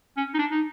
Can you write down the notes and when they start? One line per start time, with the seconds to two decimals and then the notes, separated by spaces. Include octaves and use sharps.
0.17 C#4
0.34 D#4
0.39 D4
0.51 D#4